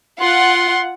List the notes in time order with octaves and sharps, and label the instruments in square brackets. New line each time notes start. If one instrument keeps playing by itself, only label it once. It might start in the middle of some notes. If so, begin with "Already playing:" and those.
[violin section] F4 F#5 [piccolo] C6